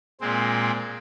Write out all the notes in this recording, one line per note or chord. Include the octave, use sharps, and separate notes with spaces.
A#2 G#3 C4